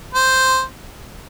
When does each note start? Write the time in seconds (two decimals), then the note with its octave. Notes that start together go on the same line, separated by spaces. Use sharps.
0.14 C5